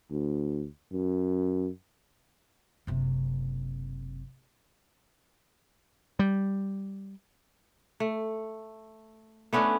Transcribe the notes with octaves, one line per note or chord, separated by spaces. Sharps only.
D2
F#2
F#1 C3
G3
A3
A3 B3 C#4 D4